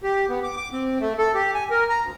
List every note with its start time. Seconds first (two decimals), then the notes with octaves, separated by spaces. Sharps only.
0.03 G4
0.29 B3
0.43 D6
0.57 D6
0.73 C4
1.00 A3
1.18 A4
1.35 G4
1.54 G#5
1.71 A#4
1.89 A#5
2.02 D2